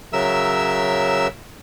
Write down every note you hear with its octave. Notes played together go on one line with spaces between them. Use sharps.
C#3 F#3 A#4 E5 E6